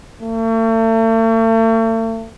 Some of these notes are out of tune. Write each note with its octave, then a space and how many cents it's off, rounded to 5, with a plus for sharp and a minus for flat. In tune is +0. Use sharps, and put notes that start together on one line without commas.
A3 +40